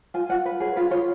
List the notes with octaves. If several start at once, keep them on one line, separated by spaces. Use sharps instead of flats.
F4 G#5
F4 F#5
B4
G#4 C#5
F4 B4
F4 C#5